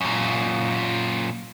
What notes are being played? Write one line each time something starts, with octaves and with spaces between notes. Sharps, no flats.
F#2 A#2